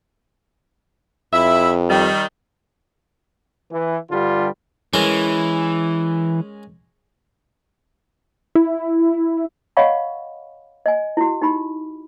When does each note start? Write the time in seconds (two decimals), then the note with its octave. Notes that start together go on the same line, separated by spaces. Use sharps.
1.33 F2 E4 E5
1.90 D#3 G3
3.72 E3
4.11 G2 D3 G3 F4
4.94 E3 G#3 C#4 A#4
8.55 E4
9.77 C#5 D#5 F5 F#5 B5 C#6
10.86 D#5 G#5
11.17 E4 F#4
11.42 D#4 G4 B5